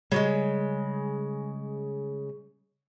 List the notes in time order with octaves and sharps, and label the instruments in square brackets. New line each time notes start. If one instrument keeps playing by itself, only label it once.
[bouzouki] C#3 F3 G#3 [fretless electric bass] G3